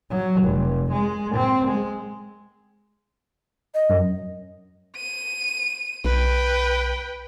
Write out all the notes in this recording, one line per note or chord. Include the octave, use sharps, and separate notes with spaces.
F#3
F1
G#3
C4
G#3
D#5
F#2
D#7
B1 B4 G5